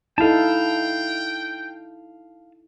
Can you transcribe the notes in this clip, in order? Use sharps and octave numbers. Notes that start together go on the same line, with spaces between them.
D#4 E4 A4 F5 G5 A5